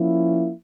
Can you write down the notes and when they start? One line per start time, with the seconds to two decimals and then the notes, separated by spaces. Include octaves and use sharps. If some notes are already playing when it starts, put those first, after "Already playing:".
Already playing: F3 A#3 C#4 E4